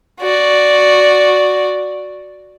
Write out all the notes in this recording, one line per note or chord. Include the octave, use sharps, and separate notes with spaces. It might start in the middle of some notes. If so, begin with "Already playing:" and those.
F#4 D5